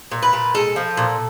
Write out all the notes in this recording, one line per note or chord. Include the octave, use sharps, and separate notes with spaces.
A#2
B4
A#2
G#3 A4
F3
A#2